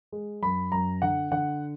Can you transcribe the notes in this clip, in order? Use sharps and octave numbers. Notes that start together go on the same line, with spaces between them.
G#3
F#2 B5
F#2 A#5
D3 F#5
D3 F#5